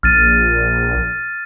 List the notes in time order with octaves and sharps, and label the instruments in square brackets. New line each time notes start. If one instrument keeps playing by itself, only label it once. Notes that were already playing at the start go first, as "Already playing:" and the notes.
[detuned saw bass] A#1 [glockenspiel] F6 A6 D#7